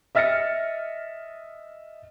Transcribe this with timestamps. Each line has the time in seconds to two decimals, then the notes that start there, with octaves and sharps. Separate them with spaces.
0.15 D#5 E5 F6 A6 A#6 C#7